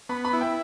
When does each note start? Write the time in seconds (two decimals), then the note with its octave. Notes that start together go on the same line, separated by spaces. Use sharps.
0.09 B3 B5
0.25 B5
0.33 E4
0.41 G5